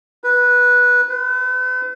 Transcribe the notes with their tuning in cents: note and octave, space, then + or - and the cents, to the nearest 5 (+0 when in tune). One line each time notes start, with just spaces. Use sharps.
B4 -10
B4 +45